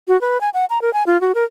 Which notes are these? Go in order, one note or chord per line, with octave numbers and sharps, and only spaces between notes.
F#4
B4
G#5
F#5
A#5
A#4
G#5
F4
F#4
A#4